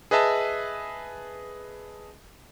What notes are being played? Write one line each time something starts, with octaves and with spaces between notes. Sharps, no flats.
G#4 B4 D#5 E5 A5